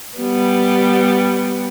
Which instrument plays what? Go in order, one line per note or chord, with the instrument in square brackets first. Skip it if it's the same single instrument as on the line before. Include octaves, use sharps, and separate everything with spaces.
[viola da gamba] G3 B3